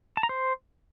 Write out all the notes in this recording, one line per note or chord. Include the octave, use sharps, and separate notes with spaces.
A5
A#5
C5